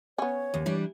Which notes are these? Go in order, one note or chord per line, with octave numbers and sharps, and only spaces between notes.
B3 C#4 C#5
D#2
E3 G3 D4